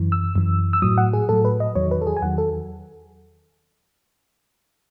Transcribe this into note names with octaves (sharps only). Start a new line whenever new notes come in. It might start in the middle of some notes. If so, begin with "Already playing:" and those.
Already playing: F#2 E3
E6
F#2 E3
E6
A2 F#3 D#6
F#5
G#4
A2 F#3 A4
B4
D#5
E2 D#3 F#3 C#5
B4
A4
G#4
G#5
E2 D#3 F#3 F#5
A4